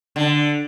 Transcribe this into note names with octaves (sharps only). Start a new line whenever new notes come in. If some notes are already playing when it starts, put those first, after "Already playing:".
D3